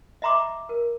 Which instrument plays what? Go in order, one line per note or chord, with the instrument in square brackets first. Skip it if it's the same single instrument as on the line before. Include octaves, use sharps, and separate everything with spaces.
[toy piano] D#5 E5 A#5 C6 D6
A#4